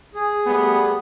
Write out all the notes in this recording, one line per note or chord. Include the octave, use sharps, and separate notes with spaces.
G#4
G3 A3 B3